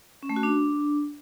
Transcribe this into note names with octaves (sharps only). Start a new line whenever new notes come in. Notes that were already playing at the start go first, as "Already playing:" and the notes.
C#4
A3
F#4
D4